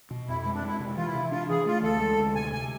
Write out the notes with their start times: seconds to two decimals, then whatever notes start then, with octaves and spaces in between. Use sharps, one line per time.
0.11 B2
0.28 F2 E4
0.41 E4
0.46 G#3
0.54 D4
0.63 G#3 E4
0.80 C3
0.97 E3 F4
1.06 E4
1.14 C3
1.31 D4 F4
1.49 E3 G#4
1.66 A3 F4
1.83 D2 A4
2.00 G#3
2.18 D2
2.35 C3 G#5
2.53 C3 G#5